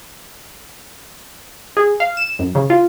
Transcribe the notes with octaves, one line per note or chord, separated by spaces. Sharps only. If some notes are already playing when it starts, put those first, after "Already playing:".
G#4
F5
E7
F#2
C#3
F4